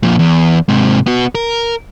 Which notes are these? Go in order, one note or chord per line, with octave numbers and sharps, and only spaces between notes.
F2 A#2
E2
G#2 C3
B3 F#4
A#4